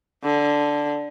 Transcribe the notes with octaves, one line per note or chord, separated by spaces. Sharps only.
D3